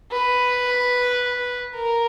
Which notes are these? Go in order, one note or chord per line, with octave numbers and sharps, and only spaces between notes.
B4
A#4